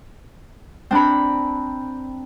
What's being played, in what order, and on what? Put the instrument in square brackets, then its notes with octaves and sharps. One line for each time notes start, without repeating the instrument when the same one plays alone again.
[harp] C4 D4 A#5 B5